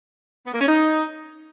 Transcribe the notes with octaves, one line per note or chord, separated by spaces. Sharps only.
B3
A#3
C#4
D#4